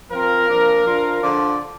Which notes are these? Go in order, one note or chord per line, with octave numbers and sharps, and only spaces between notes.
F3 C4 F4 A#4
F3 A#3 D4
F3 D4 F4
D3 F3 D4 F4 D5